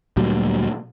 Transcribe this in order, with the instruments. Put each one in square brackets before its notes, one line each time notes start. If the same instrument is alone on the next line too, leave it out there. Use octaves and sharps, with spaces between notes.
[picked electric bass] D2 A#2 F#3 G3